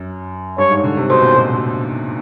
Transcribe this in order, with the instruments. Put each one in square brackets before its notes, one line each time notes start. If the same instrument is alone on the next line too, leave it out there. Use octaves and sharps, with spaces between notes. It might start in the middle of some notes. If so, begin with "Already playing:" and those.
Already playing: [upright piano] F#2
[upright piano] G2 [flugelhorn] C#5
[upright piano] G#2
D3
C3
[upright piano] B2 [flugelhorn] C5
[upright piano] A#2
B2